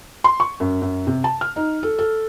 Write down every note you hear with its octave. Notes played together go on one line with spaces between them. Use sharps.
C6
C#6
F#2
F#2
C3
A5
F6
D#4
A4
A4